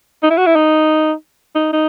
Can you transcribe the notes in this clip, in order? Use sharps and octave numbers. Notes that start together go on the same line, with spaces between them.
D#4
E4
F#4
E4
D#4
D#4
D#4